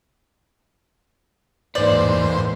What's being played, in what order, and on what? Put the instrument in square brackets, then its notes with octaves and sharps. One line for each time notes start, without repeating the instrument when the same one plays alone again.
[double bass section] A1 E2 A#3 [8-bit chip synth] G#2 C5 [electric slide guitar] D#4 B4 [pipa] D5